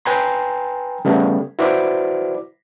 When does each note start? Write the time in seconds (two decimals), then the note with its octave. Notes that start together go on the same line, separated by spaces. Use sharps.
0.05 B4 G5 G#5 A#5 C6
1.05 C#3 G3 A3 B3
1.59 E4 F#4 B4 C5 D5 D6